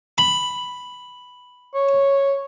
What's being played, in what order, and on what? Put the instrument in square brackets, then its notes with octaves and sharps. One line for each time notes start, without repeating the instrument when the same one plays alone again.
[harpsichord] B5
[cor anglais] C#5